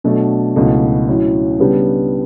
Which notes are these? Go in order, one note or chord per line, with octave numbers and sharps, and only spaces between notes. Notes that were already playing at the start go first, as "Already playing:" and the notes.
B2 F#3 A3 D4 A4
C#2 B2 F#3 A3 E4
A2 F#3 C#4 E4
C#3 G3 B3 D4 G4